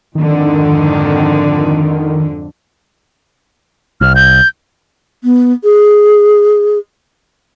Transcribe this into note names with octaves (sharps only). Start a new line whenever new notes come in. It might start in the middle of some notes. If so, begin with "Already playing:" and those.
F2 G#2 D3 D#3
C2 F6
G6
B3
G#4